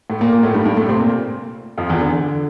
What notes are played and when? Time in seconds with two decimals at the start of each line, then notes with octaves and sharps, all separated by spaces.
0.10 A2 A3
0.21 A#2 A#3
0.32 A#2 A#3
0.43 A2 A3
0.54 G2 G3
0.65 G2 G3
0.77 A2 A3
0.88 C3 C4
1.00 A#2 A#3
1.78 F2 F3
1.89 E2 E3
2.01 D3
2.12 D3